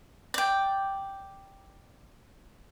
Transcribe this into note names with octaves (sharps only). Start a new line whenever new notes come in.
D5 G5